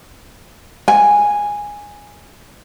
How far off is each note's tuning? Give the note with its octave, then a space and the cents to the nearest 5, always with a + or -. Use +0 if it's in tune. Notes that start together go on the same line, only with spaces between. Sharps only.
G#5 -10